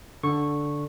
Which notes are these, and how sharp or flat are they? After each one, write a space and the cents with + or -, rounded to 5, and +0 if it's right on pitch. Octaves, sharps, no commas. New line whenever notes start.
D3 -5 C#6 -10